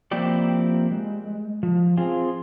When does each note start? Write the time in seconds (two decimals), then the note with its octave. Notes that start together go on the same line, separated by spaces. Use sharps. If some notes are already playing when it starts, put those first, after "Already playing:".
0.11 F3 A#3 C4 E4 G4 D5
0.91 G#3
1.63 F3
1.97 C4 F4 G#4